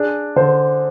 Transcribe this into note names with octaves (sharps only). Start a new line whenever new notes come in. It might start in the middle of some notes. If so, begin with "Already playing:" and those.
Already playing: D4 G#4
D3 C5